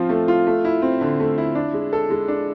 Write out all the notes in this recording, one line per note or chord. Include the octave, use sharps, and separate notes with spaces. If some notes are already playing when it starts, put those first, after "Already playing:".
Already playing: F3 C4 F4
A3
F4
A3
E4
C4
D3
A3
E4
D4
G#3
A4
G#3
D4